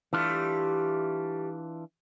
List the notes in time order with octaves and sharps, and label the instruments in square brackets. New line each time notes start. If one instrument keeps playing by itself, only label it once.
[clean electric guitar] E3 D4 F4 [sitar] G3 A3